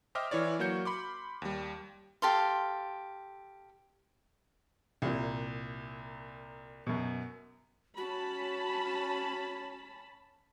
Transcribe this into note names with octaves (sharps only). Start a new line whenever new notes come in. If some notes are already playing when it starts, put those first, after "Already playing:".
C5 D#5 E5 G5 D6 F6
E3 E4 C#5 D5
F#3 A#3 F#4 C#5 G6 C#7
B5 C6 D6
D#2 G3
G4 A4 F5 C6
C2 A#2
F#2 B2
C#4 F#4 A5 B5